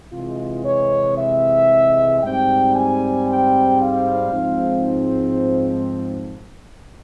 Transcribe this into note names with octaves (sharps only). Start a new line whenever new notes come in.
C3 E3 G#3 F4
C#5
E5
G#2 G3 C4 G5
G#5
G5
F5
G#2 F3 C4